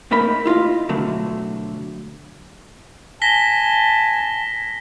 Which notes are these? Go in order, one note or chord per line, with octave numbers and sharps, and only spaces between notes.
A2 A3 A#3 D#4 B5
E4 F4 D#5 F5
B2 D3 F#3 A3
G#5 A5 A#6 B6 G7